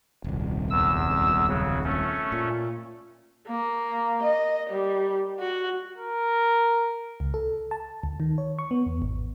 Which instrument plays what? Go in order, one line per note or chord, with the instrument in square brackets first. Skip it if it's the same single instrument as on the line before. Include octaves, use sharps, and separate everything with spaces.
[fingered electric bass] D#1 C2
[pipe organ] E2 E6
C#3 F#3
A3 C#4
[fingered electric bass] A#2
[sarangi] A#3
D#5
G3
F#4
[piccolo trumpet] A#4
[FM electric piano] C#2
A4
A5
D2
D#3
C#5
C#6
B3
E2
G#1